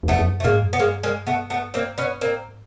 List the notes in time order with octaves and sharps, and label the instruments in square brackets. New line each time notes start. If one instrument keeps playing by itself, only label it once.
[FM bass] E2
[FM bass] F2 [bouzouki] A3 B3
[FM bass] F2
F#2
[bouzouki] A3
[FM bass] G#2 [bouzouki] G#3 A#3
[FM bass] F#2
[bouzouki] B3
[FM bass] G2 [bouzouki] G#3 A#3
[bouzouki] G#3 A#3
A3 B3
A3 B3
A#3 C4
B3 C#4
[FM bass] A2 [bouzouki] A#3 C4
[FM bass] G#2